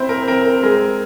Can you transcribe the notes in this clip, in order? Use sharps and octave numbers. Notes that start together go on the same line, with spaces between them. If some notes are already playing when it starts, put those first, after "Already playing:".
Already playing: C4 E4 C5
A#4
C4 A#4
A#4
G#3 A#4